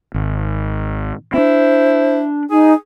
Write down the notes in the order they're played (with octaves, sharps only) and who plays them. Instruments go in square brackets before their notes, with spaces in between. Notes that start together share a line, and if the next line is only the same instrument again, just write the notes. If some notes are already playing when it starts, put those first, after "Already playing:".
[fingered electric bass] G#1
[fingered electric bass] C4 D4 [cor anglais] E4 [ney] C5
[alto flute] D#4 [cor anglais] G#4 [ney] G#5